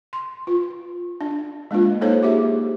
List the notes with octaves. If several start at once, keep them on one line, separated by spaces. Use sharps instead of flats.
C6
F4
D4
G#3 A#3 D4 F4
A#3 D#4 A4 C5 C#5
G4 G#4 E5